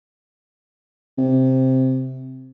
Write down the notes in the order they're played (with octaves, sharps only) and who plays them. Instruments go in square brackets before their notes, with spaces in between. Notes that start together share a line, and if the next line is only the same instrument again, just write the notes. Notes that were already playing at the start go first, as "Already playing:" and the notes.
[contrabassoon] C3